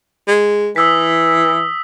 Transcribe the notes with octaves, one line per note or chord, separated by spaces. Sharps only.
G#3
E3 D#6 E6 B6